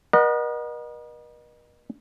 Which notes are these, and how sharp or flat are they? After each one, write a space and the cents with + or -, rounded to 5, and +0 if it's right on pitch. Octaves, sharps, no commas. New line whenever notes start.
A#4 +45 D#5 -35 F#5 +0